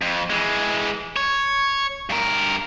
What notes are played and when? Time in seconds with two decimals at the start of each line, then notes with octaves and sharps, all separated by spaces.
0.02 F2
0.30 E3 G#3
1.16 C#5
2.10 G2 A#4